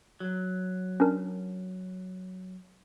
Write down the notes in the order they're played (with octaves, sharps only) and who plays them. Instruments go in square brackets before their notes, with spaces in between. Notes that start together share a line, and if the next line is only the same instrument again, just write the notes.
[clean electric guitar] F#3
[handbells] C#4 D4 A#4